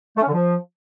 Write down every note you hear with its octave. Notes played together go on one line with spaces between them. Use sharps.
A3
C#4
D3
F3